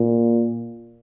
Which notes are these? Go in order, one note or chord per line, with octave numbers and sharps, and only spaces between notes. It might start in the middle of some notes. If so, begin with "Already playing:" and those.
Already playing: A#2